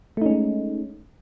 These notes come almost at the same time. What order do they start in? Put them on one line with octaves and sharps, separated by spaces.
A3 D#4 C#4 G#3